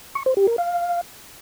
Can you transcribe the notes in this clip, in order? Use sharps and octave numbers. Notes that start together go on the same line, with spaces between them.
C#6
C5
G4
A#4
F5